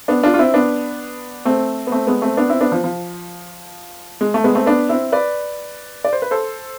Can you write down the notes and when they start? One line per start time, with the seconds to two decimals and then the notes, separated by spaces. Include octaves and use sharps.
0.08 B3 D4
0.23 D4 F4
0.34 F4
0.39 C4 E4
0.54 B3 D4
1.45 A3 C4
1.87 B3
1.92 A3 C4
2.07 G#3 B3
2.22 A3 C4
2.37 B3 D4
2.49 C4 E4
2.61 B3 D4
2.72 F3
2.84 F3
4.21 G#3
4.34 A3
4.44 G#3 B3
4.55 A3 C4
4.66 B3 D4
4.89 C4 E4
5.12 B4 D5
6.04 D5
6.13 C5
6.22 B4
6.31 A4 C5